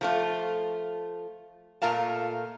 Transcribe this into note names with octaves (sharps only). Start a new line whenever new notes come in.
F3 A3 F4
A#2 A3 F4 A#4 F5 A5